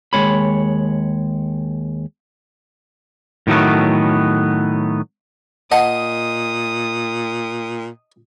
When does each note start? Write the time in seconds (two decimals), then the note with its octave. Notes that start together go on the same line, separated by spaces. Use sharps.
0.13 D#2 E3 G#3 C#5 B5
3.47 A2 D#3 F#3 A3 B3
5.72 A#2 D#5 F#5 A5 D#6